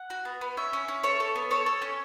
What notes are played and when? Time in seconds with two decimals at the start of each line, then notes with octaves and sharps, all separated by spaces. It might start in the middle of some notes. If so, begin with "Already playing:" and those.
Already playing: F#5
0.10 F#4
0.25 B3
0.41 B3
0.57 C#4 E5
0.73 C#4
0.88 C#4
1.03 A4 C#5
1.20 A4
1.35 B3
1.51 A4 C#5
1.66 A4
1.82 C#4